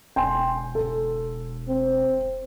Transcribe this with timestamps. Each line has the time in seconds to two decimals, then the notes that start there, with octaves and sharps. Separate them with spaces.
0.16 E1 G5 G#5 C6
0.75 A4
1.68 C4